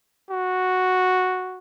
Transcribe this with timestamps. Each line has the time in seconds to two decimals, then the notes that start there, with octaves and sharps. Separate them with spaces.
0.30 F#4